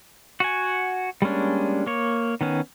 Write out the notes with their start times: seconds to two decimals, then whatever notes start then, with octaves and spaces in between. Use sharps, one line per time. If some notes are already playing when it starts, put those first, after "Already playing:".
0.40 F#4 F#5 G#5
1.22 G3 G#3 A#3 C#4 D4
1.86 A#3 C#5
2.41 D#3 B3 C#4